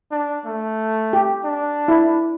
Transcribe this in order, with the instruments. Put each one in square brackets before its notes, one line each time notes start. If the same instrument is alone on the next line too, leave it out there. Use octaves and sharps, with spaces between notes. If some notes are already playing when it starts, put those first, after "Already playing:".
[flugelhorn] D4
A3
[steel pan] G4
[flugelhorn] D4
[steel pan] E4